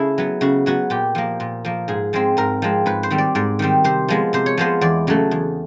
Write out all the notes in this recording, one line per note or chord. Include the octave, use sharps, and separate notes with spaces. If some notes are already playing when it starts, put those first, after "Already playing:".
Already playing: C#3 A3 E4 G#4
F#3 B3
C#3 F#4
F#3 B3 F#4
A#2 G4
F3 A#3
A#2
F3 A#3
G#2 G#4
F3 G#3 C4
G#2 A#4
F3 G#3 C4
G#2 B4
C5
D#3 G3 C4
D5
G#2 D5
D#3 G3 C4
C3 C5
F3 G#3 B3
C3 C5
C#5
F3 G#3 B3 C5
E2 D5
C#3 F#3 A3
E2